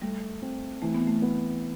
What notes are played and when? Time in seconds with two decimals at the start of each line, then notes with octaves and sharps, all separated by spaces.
0.02 G3 A3
0.42 C4
0.82 E3 A3
0.94 B3
1.07 A3
1.22 B3